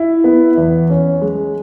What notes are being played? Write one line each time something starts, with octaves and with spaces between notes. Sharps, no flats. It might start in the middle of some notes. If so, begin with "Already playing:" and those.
Already playing: E4
B3
E2
C#4
G#3